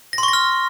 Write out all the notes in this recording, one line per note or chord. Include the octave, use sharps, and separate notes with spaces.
A#6
C6
C#6
A#6
F6